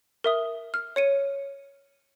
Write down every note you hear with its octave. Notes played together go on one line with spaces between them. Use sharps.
A#4 E5 D#6
F6
C#5 C#7 D#7